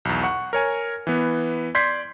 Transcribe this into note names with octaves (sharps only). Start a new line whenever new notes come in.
B1 E2
F#5 C#6
A#4 C#5 G#5
E3 B3
D5 C6 G6 G#6 B6 C7